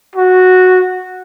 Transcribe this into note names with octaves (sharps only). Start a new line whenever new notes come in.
F#4